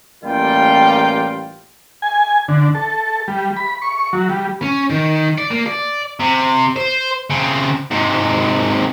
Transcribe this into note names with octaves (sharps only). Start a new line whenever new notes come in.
A1 G3 A#3 F4 G5
G#5
D3
A4
G3
B5
C#6
F#3
G3
C#4
D#3
D5
A#3
D5
C3
C5
C#3 C4
G#2 C3